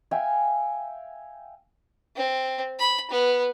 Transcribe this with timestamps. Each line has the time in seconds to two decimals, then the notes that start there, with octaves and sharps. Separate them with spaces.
0.11 E5 F5 G5 G#5
2.16 C4
2.79 B5
3.11 B3